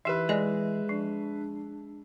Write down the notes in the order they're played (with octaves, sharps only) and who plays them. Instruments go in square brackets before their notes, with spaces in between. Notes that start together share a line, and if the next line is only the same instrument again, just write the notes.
[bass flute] E3 [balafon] D#4 G4 [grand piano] B4 E5
[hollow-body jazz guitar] G#3 [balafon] D5 D#5 G#5
[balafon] F3 [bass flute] D4